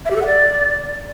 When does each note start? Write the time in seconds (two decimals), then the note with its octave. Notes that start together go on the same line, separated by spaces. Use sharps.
0.05 E5
0.11 G4
0.16 A4
0.21 F#5
0.26 D5